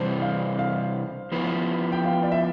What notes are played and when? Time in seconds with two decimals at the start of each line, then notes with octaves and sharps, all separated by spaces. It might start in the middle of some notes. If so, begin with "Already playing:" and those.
Already playing: C3 E3 G3 D4 C5
0.22 F5
0.59 F5
1.32 F3 B3 E4 B4
1.92 G5
2.05 F5
2.23 D5
2.32 E5